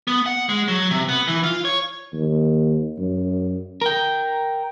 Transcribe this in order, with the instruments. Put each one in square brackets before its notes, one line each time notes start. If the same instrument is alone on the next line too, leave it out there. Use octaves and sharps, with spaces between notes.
[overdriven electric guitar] B3
F#5
G#3
F#3
C3
B3
E3
F4
C#5
[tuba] D#2
F#2
[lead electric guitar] A#4 G5